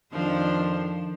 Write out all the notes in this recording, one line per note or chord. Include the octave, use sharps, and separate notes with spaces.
F2 D#3 F3 D4 C5